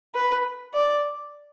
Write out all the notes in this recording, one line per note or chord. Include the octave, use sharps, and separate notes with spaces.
B4
D5